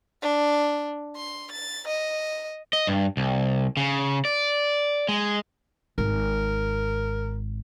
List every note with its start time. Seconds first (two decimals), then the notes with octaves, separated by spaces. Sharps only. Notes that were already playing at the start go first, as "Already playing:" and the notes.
0.22 D4
1.16 C6
1.51 A6
1.88 D#5
2.73 D#5
2.87 G2
3.17 C2
3.77 C#3
4.25 D5
5.09 G#3
5.98 G#1 A#4